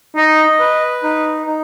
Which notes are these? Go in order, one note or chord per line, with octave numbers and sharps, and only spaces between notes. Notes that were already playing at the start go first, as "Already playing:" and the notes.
D#4 D#5
B4
D#4
D#4